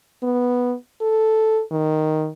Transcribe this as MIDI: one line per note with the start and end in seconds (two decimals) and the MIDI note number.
0.23 0.74 59
1.01 1.61 69
1.71 2.29 51